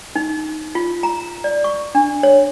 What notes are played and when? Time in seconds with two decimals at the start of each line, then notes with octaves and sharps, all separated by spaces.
0.15 D#4
0.75 F4
1.03 A#5
1.44 D5
1.64 C#6
1.95 D4
2.23 C#5